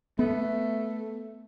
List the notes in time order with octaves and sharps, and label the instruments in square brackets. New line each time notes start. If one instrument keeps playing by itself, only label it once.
[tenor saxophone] A3 [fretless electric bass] B3